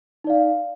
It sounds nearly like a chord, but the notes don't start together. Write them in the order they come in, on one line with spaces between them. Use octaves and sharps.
D#4 D5 F5